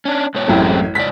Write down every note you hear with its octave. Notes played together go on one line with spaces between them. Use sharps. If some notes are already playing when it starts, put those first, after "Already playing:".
C#4 D4
G#2 B2 C#5
A1 F#2 A2 G#3 C4 G4
G#2 C#3 D5 B6